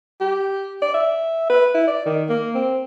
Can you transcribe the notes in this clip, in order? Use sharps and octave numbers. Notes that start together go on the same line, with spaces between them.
G4
D5
E5
B4
E4
D5
D#3
A#3
C4